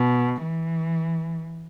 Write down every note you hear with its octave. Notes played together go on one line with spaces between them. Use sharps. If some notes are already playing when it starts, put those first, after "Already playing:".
Already playing: B2
E3